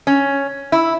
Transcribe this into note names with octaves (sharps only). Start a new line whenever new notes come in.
C#4
E4